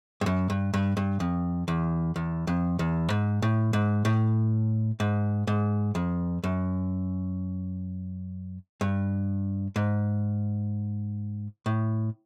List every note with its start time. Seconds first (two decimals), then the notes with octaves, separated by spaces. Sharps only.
0.21 G2
0.26 F#2
0.50 G2
0.74 G2
0.97 G2
1.20 F2
1.68 E2
2.16 E2
2.47 F2
2.79 E2
3.10 G#2
3.42 A2
3.73 G#2
4.05 A2
5.00 G#2
5.47 G#2
5.95 F2
6.44 F#2
8.81 G2
9.76 G#2
11.66 A2